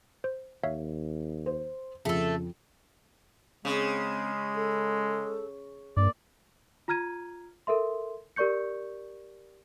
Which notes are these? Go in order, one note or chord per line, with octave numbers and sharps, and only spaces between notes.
C5
D#2 C#5 E5 F5
C5
F2 C#3 A3 G#4 A4
C#3 G#3 C4
A4
G2 A#3 D5
F4 A#5 F6 G#6 D#7
A4 A#4 E5 C6
G4 A#4 D5 C#6 G6 C#7